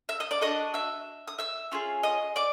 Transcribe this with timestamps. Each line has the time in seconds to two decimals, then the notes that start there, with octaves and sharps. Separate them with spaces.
0.09 E5 E6
0.20 D#5 D#6
0.31 D5 D6
0.41 D4 F#4 A4 D#5 D#6
0.74 E5 E6
1.28 D#6
1.39 E5 E6
1.72 C#4 F4 G#4
2.03 D#5 D#6
2.36 D5 D6